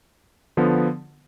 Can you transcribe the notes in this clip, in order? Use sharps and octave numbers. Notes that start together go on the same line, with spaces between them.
D3 F3 B3